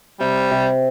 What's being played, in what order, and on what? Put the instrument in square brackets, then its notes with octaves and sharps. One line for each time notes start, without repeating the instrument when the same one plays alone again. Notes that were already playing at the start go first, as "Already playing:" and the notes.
[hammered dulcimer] C3 [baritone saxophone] G3
[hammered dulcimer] C3